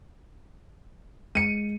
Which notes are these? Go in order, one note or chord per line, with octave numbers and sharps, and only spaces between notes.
G#3 C#7 D#7